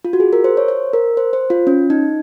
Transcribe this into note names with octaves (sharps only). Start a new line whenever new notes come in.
F4
F#4
G#4
A#4
C5
C#5
C5
A#4
C5
C5
F4
C#4
D#4